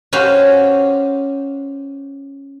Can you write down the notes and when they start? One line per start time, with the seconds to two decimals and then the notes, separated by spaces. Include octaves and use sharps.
0.13 C#4 F#4 G4 C5 F5